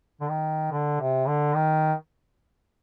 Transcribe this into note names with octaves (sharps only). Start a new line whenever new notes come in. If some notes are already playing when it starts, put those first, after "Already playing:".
D3
D#3
D3
C3
D3
D#3